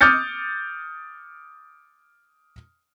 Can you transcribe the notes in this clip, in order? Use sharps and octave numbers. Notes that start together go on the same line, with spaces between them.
D6 D#6 F6 G6 A6 C#7